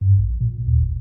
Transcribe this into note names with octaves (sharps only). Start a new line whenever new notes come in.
G2
A#1
A#2
D#2
G1